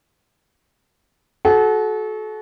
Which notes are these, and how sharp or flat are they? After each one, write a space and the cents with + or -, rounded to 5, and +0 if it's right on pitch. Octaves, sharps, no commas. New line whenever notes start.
F#4 +0 A4 -35